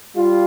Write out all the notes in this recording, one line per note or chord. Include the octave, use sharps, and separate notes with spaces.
G3 F4